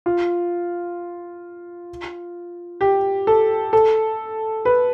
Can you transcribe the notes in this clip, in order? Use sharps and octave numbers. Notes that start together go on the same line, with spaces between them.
F4
G4
A4
A4
B4